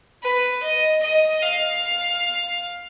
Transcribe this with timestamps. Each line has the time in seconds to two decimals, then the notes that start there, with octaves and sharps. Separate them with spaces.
0.23 B4
0.63 D#5
1.03 D#5
1.43 F5